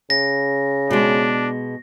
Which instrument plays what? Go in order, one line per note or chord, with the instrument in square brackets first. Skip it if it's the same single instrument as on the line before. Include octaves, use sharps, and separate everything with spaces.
[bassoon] C#3 [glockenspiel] A#6
[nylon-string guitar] B2 G#3 [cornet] D4